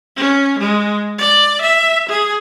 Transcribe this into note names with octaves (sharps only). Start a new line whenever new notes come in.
C#4
G#3
D5
E5
G#4